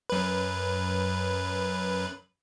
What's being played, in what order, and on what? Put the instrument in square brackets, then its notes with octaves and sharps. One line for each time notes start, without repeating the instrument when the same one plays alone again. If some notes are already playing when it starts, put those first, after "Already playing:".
[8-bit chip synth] F#2 B4